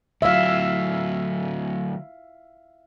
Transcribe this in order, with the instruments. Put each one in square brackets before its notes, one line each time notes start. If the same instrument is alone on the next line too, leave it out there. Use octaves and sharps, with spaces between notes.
[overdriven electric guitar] D2 F#3 [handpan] E5 F5